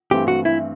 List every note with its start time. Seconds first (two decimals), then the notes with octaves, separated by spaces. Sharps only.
0.11 G2 E3 A3 C4 G4
0.28 F#4
0.45 E4